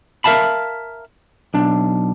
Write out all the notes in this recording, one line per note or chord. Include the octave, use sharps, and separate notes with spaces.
A#4 E5 F5 A5 B5
B1 D4